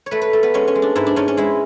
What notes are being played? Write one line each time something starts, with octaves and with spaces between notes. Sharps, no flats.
C#5
A3 B4
B4
A3
B3
G#3 C#4
C#4
G#3
D4
G#2 E4
D4
G#2 C#4
C#4
G#3 E4